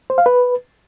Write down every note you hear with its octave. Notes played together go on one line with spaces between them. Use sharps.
C5
F5
B4